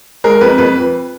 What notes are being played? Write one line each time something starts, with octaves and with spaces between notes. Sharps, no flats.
G#3 A#4
F2 B4
F2 B4